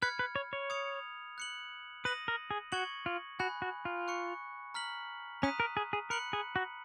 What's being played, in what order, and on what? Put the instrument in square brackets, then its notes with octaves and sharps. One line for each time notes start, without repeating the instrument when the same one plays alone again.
[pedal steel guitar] B4 [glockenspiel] B5 F6 G#6 C#7
[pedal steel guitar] B4
C#5
C#5
[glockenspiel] D#6 G#6 C#7 F7
F#6 C#7 F#7
[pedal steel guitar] B4 [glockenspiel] D#6 A#6 D#7 F#7
[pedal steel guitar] A#4
G#4
[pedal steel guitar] F#4 [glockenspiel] C#6 G#6 C#7 F#7
[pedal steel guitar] F4
[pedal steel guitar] F#4 [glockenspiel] G#5 B5 F#6
[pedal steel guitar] F#4
F4
[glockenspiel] C#6 F#6 C#7
A#5 F6 B6 F#7
[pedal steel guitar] C#4 [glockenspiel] A#5 D#6 F#6 B6 D#7
[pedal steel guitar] A#4
G#4
G#4
[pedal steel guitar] A#4 [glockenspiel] B5 F#6 C#7 F#7
[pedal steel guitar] G#4
F#4